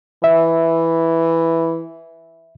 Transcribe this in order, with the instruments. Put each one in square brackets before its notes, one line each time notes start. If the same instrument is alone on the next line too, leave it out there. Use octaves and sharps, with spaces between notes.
[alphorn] E3 [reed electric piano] E5